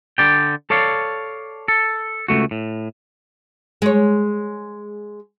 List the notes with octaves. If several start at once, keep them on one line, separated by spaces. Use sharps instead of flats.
D3 D5 G5
A4 C#5 D5 F5
A4
C#2 C#3 A3 F#4
A2
G#3 C#5